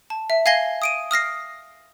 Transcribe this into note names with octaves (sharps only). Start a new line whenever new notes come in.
A5
E5
F5 G#5 G#6 A#6 C7 G7
D#6 D7 D#7
D#6 F6 A#6 C7